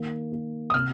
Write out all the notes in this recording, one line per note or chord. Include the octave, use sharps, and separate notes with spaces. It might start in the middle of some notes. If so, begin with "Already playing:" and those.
Already playing: D#3 A#3
A#3
D#6
C3 F6